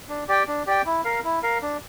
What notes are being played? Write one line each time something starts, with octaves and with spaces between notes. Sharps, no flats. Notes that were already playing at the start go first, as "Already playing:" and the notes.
D4
G4 D5 G5
D4
G4 D5 G5
E4
A#4 F5
E4
A#4 F5
D4